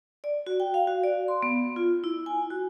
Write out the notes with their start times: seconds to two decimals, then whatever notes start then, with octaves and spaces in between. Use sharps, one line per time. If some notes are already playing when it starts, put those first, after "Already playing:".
0.24 D5
0.47 F#4
0.60 G5
0.74 F5
0.87 F#4
1.03 D5
1.28 C6
1.43 B3
1.76 F4
2.04 E4
2.26 G#5
2.50 F#4